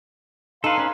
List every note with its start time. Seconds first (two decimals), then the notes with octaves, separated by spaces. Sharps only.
0.64 D#4 A4 B4 F5 C6
0.78 C#4 B4